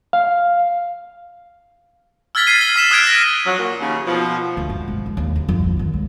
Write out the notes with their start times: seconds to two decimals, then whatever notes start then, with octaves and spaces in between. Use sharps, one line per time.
0.13 F5
2.35 E6 F6 G#6 A6 B6 G7
2.47 F6 G#6 B6 C7 D#7
2.61 G7
2.76 E6 B6 E7
2.91 D#6 F6 F#6 G#6 D7 D#7
3.07 A#6
3.46 F3 F#3 C#4 F#4
3.59 A#2
3.80 D#2 C#3
4.06 B2 F3
4.57 D2
4.70 G#2
4.88 G#1
5.06 E2
5.17 D#2
5.36 D2
5.49 F2
5.64 A1
5.79 D#3
5.94 C#2